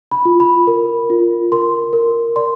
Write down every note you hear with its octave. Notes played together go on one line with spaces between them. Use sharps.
B5
F4
B5
A#4
F4
A#4 C6
A#4
D5 C6